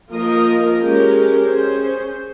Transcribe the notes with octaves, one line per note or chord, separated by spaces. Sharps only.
F3 A#3 F4 A#4 D#5
G#3 C#4 G4 A#4
C#4 G#4 C5